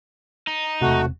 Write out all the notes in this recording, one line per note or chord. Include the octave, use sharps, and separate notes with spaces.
D#4
E1 C3 A3 F#4